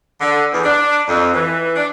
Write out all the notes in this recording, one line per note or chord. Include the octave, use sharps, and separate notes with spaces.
D3
E2
D4
F2
E3
D4